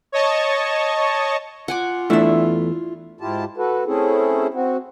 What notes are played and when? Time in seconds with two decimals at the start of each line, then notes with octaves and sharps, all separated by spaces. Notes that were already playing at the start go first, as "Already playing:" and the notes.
0.12 C#5 D#5 A5 C#6
1.68 F4 F#5 G#5 D6
2.10 E2 A3 D4 E4 E5
3.21 G#2 E4 F4 G4 A5
3.58 F#4 A4 B4
3.86 A3 C4 C#4 E4 G#4 A4
4.54 C4 F#4